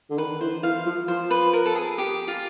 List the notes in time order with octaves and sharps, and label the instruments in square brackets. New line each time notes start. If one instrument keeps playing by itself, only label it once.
[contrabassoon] D3
[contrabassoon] D#3 [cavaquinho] B4
[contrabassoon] E3 [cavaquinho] C5
[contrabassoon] E3 [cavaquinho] F5
[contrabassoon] F3
[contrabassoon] F3 [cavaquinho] C5
[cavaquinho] B4
A#4
A4
G#4
G4
F4